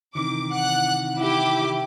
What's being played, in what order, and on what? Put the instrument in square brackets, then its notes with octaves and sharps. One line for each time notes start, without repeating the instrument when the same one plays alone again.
[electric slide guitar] C3 D#3 E3 [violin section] D6
[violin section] F#5 F#6
E4 G4 D6